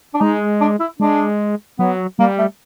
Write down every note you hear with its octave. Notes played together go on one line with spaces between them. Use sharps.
D4
G#3 D#4
D4
E4
G#3 D4
F#3 B3
G3 A#3
A3